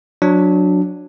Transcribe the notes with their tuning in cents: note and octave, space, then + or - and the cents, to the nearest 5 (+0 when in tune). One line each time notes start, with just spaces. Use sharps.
F#3 -20 D4 +0